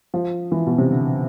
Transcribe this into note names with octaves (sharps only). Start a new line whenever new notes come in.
F3
E3
B2
C3
D3